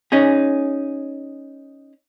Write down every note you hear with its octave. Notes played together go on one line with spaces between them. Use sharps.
C#4 D#4 G#4